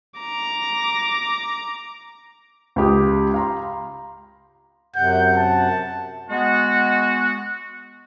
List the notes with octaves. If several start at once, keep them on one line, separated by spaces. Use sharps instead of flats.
A#5 D6
C#2 G4 D#6
F5 A#5 C6
F#2 C3 F#5 G6
A5
G#3 B3 F#4